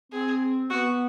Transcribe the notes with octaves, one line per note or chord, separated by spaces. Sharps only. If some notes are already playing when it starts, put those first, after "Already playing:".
C4 G#4
B3 F#4